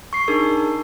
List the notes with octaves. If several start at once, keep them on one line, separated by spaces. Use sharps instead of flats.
C#6 C7
D4 D#4 G#4 A#4